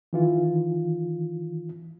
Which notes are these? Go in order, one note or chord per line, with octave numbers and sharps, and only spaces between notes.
D#3 E3 F4